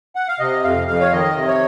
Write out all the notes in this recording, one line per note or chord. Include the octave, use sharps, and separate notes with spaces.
F#5
F5
C3 D#5
F2 F5
F2 F5
C#5
D#3 D#5
C3
C#5